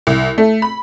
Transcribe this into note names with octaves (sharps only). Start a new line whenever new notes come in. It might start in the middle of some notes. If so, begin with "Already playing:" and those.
C2
A3
B5